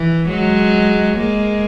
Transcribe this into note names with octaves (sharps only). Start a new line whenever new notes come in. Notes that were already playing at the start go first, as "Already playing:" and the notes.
Already playing: E3
F#3 G#3
G#3 A#3